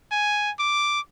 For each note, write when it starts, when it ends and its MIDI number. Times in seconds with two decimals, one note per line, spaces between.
0.12 0.51 80
0.59 1.00 86